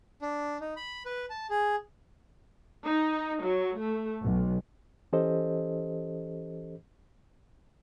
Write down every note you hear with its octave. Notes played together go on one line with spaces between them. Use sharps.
D4
D#4
B5
B4
A5
G#4
D#4
F#3
A3
B1
E3 C#4 G4 A4 C5 D#5